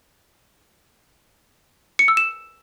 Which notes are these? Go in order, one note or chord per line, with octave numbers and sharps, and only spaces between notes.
C#7
E6
E7